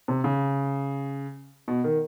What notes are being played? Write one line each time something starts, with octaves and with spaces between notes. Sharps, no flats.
C3
C#3
B2
D#3